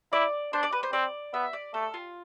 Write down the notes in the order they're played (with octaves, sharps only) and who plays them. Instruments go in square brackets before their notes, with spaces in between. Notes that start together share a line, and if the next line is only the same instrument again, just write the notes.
[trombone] E4 [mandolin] D5
[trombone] D4 [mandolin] C5
[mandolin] D5
B4
C5
[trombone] C4 [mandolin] D5
[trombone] B3 [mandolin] E5
[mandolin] D5
[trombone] A3 [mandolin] A4
[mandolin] F4